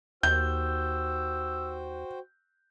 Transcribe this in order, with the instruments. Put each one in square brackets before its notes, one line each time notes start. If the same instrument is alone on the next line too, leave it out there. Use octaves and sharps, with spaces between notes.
[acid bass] D#2 [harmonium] F#4 C5 G5 [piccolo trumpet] E6 [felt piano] G6